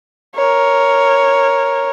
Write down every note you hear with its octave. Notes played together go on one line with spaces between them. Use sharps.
A#4 C#5